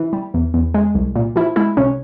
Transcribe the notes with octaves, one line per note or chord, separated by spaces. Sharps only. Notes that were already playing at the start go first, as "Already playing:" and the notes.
Already playing: E3
G3
E2
E2
G#3
C2
A#2
F3 E4
G#3 E4
C2 C#4